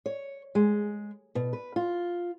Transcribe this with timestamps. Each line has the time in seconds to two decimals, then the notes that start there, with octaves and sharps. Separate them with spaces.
0.06 C#5
0.55 G#3
1.35 B2
1.53 B4
1.76 F4